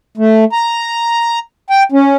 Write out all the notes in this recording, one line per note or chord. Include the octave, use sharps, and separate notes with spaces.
A3
A#5
G5
C#4